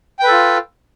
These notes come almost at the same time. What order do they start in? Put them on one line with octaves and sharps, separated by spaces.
G5 B4 A4 F4